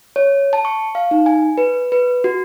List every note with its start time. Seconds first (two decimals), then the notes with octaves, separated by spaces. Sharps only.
0.16 C#5
0.53 A5
0.65 C#6
0.95 F5
1.11 D#4
1.26 G#5
1.58 B4
1.92 B4
2.24 F#4